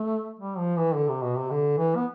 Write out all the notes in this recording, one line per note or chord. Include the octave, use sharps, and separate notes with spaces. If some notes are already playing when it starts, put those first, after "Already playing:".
Already playing: A3
G3
F3
E3
D3
C3
B2
C3
D3
E3
B3